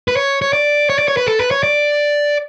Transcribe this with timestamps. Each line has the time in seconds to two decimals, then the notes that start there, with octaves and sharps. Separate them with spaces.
0.08 B4
0.17 C#5
0.42 C#5
0.53 D5
0.90 C#5
0.99 D5
1.08 C#5
1.17 B4
1.27 A4
1.39 B4
1.51 C#5
1.63 D5